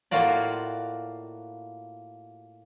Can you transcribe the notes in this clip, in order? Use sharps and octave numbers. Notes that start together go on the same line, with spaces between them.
A2 A#3 F4 F#4 D5